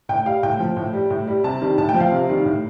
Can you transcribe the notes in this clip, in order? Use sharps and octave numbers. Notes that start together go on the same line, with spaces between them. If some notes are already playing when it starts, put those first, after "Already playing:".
A2 G5
G3 F5
A2 G5
F3
A2
G3
A2
G3
C3 A5
D#3 G3
A2 A5
G5
F3
F5
C3
D#3 G3
A2